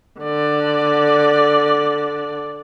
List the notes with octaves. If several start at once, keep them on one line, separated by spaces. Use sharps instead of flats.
D3 D5